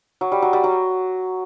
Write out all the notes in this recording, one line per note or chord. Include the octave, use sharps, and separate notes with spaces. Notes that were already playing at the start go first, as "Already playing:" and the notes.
F#3
G3
F#3
G3
F#3